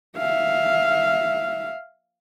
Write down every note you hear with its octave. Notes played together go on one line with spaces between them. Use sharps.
E5 F5